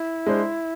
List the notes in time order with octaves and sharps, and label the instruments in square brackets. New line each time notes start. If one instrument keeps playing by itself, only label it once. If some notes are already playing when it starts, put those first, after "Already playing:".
Already playing: [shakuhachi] E4
[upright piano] G#3 D4 G#4 C5